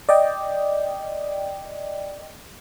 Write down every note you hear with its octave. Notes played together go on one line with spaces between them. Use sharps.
D5 D#5 G5